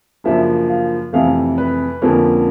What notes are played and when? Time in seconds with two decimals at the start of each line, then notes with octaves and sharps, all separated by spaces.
0.24 F#2 C#3 F3 A#3 D4 E5
0.69 F5
1.13 F2 C3 E3 A3 F5
1.58 B4
2.02 F2 D3 F3 A#3 C#4